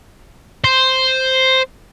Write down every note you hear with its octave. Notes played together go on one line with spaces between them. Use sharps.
C5